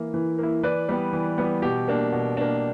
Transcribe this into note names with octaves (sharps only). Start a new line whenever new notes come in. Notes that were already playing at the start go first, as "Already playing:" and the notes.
Already playing: E3 A#3 E4
E3
A#3 E4
E3 B4 D5
G3 B3
E3
G3 B3
B2 G4
A#3 D4
B2
A#3 D4